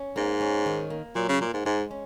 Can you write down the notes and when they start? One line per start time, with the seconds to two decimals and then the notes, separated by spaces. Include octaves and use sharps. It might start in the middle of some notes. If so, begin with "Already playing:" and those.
Already playing: C#4
0.16 G#2 A#3
0.41 C#4
0.66 D#3
0.90 A#3
1.15 A#2 F#3
1.29 C#3
1.41 A#2 A#3
1.54 G#2
1.65 G#2 G#3
1.91 C#4